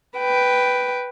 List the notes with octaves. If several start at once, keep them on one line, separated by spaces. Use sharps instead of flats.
B4 G5